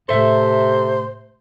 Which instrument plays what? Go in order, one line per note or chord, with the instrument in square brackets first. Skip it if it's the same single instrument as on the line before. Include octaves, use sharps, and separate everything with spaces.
[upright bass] A2 A3 [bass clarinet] C3 [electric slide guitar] A4 E5 [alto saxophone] C5